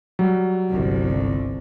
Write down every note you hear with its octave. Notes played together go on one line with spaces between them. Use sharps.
F#3 G3
G1 C2